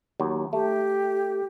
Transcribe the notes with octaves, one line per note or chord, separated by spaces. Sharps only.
D#2 F#3
A3 G4